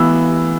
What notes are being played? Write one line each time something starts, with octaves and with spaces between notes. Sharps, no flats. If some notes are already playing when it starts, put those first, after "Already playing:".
Already playing: E3 B3 E6